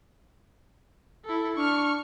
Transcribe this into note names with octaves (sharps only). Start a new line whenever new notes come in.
E4 A4
D4 C#6 F6